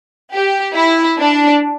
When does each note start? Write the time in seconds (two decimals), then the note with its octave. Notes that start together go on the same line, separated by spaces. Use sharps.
0.33 G4
0.75 E4
1.19 D4